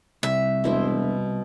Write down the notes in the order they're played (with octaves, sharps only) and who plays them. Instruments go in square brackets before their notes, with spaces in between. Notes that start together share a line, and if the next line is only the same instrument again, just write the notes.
[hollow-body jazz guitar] C2 [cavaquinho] E5
[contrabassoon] E1 [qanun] B2 E4 C5